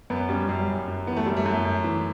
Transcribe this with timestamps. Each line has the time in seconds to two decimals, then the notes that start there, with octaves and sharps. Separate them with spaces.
0.10 F#2 B3
0.29 G3 C#4
0.49 F#2 G3
0.68 F#2
0.88 F#2
1.07 E3 B3
1.17 A3
1.26 F#2 G3
1.37 A3
1.45 F#2
1.65 F#2
1.84 E3